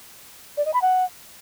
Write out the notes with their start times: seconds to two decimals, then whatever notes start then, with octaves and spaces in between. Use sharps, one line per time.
0.57 D5
0.65 D#5
0.74 B5
0.82 F#5